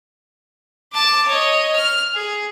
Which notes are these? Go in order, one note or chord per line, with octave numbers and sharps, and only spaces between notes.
A5 D6
C#5 D#5
F6
G#4